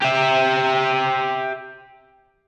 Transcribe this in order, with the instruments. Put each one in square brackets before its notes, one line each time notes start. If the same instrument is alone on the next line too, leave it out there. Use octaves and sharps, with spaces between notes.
[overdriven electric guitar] G4 E5